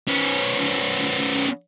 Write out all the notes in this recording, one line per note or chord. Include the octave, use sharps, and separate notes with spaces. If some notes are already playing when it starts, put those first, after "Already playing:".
B3 C#4